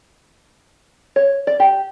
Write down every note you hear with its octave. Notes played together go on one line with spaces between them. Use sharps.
C#5
D5
G4